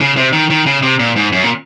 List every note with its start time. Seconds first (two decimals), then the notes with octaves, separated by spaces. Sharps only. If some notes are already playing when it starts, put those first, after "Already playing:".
0.01 C#3
0.17 C3
0.33 D#3
0.50 D#3
0.66 C#3
0.83 C3
1.00 A#2
1.16 G#2
1.33 F#2
1.43 A#2